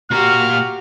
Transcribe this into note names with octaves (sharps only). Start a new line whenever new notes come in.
A#2 F#4 G4 A#5 F6